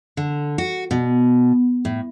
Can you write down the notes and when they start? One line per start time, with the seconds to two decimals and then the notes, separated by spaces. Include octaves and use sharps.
0.17 D3
0.58 F#4
0.91 B2
1.85 A2